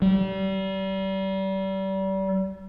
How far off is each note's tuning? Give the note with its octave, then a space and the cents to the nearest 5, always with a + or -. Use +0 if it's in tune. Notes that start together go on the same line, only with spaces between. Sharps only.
G3 -30